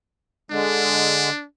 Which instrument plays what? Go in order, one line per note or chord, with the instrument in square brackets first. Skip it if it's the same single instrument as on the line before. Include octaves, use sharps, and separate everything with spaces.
[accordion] D3 G#3 [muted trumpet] D4